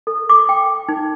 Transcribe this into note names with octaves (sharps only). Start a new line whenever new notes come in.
A4
D6
G5
D#4